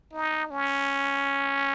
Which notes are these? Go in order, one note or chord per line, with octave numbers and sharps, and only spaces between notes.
D#4
C#4